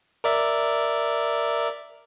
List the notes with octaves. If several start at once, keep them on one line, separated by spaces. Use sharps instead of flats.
A#4 D5 E5